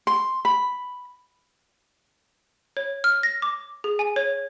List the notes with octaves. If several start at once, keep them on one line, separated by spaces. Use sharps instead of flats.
C6
B5
C#5
F6
A#6
D6
G#4
G#5
C#5